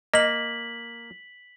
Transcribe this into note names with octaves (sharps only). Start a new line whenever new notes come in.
A#3 D#5 B6 F#7